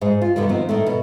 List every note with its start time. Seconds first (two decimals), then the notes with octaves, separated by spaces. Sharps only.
0.01 G#2 G#3
0.22 F4
0.36 G2 B2 D3 D#3 G3
0.49 D#3 F3 B3 C4
0.69 A2 D#3 A3
0.86 B2